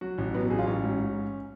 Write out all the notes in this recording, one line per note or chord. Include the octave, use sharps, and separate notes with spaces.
F#3 F#4
A1
F#3 B3
A1 G#4
F4
A1 C#4
G#2